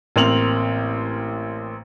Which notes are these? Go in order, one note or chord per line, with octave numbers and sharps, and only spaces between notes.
A1 A#3 C4 F7 F#7